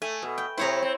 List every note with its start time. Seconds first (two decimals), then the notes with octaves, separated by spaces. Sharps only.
0.02 A3 G#5
0.22 B2
0.38 G5
0.57 C3 E4 C5 C#5 A#5
0.82 C4